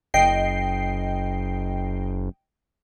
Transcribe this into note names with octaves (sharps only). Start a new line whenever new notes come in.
F#1 D#5 G5 C7